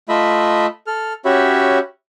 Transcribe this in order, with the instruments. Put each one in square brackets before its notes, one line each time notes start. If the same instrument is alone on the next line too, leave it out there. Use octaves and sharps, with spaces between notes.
[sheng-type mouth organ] A3 F4 D#5 E5 B5
A4 F6
C#4 F#4 G4 C#5 E5 B5